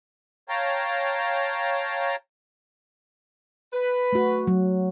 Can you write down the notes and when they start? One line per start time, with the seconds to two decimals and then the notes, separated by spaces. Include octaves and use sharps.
0.49 C#5 F5 G5 A5 A#5
3.72 B4
4.12 A3 F#4
4.47 F#3